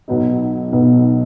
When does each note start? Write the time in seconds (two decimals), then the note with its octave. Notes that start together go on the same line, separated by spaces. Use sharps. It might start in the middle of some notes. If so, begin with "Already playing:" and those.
0.08 B1 B2 F#3 B3 D#4
0.72 B1 B2 F#3 B3 D#4